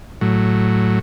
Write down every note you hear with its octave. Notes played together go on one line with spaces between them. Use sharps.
A2 F#3